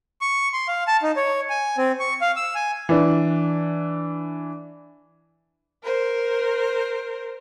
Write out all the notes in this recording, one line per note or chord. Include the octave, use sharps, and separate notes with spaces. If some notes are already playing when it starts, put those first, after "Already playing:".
C#6
C6
F5
A5
D#4
C#5
G#5
C4
C#6
F5
E6
G#5
E3 D4
A#4 C5